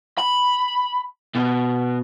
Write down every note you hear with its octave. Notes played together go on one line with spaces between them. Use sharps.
B5
B2